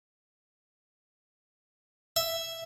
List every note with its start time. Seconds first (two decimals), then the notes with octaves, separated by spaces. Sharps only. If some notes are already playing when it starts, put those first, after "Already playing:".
2.16 E5